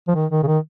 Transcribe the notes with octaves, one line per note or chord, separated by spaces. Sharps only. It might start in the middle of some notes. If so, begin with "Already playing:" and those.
F3
D#3
D#3
C#3
D#3